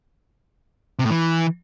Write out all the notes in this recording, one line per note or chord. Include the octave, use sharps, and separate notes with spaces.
C3
A2
E3